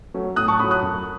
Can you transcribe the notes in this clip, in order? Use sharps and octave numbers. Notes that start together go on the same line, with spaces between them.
F#3 A3 C#4
A2 D#6 F#6
A5 C#6
F#3 A3 C#4 B5 D#6
D#6 F#6
F#2